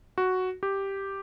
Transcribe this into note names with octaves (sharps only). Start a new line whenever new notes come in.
F#4
G4